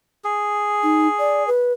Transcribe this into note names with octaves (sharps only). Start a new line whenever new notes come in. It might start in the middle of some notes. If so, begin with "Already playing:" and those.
G#4
D#4
D5
B4